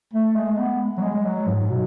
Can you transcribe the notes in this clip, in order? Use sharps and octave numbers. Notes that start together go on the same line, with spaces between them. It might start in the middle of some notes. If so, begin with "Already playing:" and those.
A3
G#3
B3
F#3
G#3
G#3
F#3
G#2
B2